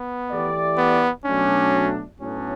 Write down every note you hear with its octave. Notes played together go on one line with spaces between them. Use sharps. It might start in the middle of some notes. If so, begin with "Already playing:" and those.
Already playing: B3
E3 A3 E4 G4 D5
B3
B2 F#3 A3 C#4 D4
A2 F#3 B3 C#4 D4